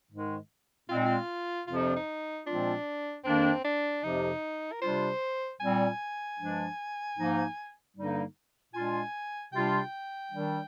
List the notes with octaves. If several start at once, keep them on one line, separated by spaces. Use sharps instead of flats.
G#2 D#3 G#3
A#2 G#3 C4 F4
D#4
F4
F2 C3 F3 F4
D#4
D4
D#4
A#2 F3 G#3 C4 D4 F4
F2 D#3 A#3 C4 D4
D4
F2 C3 F3 D#4
A#4
C3 G3 D4 F4 C5
A#2 G3 C4 G#5
G2 F3 G#3 D4
G#2 F3 A#3 D#4
G2 D3 G3 A#3 D#4
A#2 G#3 D4 F4 G#5
C3 G3 D4 F4 G5
D#3 G3 D4